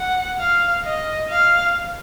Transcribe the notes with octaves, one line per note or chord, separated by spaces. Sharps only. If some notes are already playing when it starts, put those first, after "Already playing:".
Already playing: F#5
F5
D#5
F5